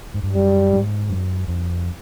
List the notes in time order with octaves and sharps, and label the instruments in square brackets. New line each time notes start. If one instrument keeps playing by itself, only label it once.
[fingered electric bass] G#2
G2
[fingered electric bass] F#2 [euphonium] G3
[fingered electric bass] G#2
F#2
F2